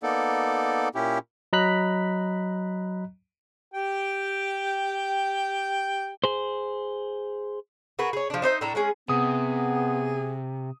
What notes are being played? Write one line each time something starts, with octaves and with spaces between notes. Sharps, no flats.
A#3 B3 D#4 A4 D5
A#2 C#4 E4 G4
F#3 D#5 A#5 B5 F#6 B6
G4 G5
G#4 C5
F#4 G#4 A#4 B4
G#4 C#5
F3 D4
D4 D#4 C5 E5
A2 D4 A4 A#5
G#3 C#4 G#4
C3 B3 G#4 D#6